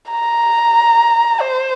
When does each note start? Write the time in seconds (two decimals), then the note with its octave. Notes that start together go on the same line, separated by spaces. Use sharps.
0.11 A#5
1.41 C5